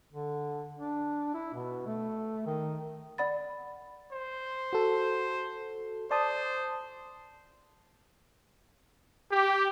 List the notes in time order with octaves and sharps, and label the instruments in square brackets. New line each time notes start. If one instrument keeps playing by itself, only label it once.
[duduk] D3
D4
E4
B2
A3
D#3
[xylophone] D5 F#5 B5 A6
[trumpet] C5
[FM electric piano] F#4 A4
[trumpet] C5 [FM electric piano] D5 A5 D#6
[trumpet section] G4